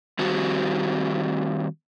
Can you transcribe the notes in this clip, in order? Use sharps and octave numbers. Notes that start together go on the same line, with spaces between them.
D#3 G3 C4 F#4